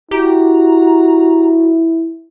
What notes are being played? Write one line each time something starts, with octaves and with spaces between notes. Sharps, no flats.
E4 F#4 G4 A#5